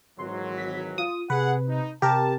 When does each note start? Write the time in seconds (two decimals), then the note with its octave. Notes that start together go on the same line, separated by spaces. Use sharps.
0.18 G#1 E3 F#3 C6
0.57 B6
0.98 F4 D#6
1.30 C3 G#4 B4 F#5
1.68 D#4
2.02 C3 G4 A#4 A5